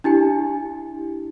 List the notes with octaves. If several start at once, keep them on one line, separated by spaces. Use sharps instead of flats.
D4 E4 G4 G#5